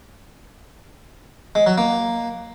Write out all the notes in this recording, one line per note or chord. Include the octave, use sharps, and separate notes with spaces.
G#3
F#3
A#3